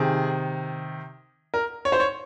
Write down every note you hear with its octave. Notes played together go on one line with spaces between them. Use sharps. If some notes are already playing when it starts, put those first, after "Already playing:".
Already playing: C3 D#3 G#4
A#4
C#5
C5
C#5